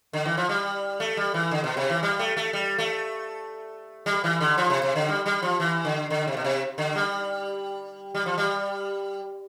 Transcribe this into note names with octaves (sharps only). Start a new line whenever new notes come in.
D3
E3
F3
G3
A3
G3
E3
D3
B2
C3
E3
G3
A3
A3
G3
A3
G3
E3
D3
F3
C3
C3
D3
G3
G3
F3
E3
D3
D3
C3
B2
C3
D3
G3
G3
F3
G3